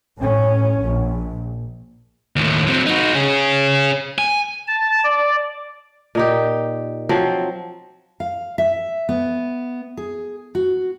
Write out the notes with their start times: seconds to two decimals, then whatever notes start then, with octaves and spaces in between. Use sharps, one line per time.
0.18 A2 C#4
0.82 A#1
2.36 D#2 A2
2.67 F#3 C4
2.86 D#4 F#4
3.15 C#4 G#4
4.18 G#5
4.67 A5
5.04 D5
6.15 A#2 D#4 G4
7.09 F3 F#3 C4
8.20 F5
8.58 E5
9.09 B3
9.97 G#4
10.55 F#4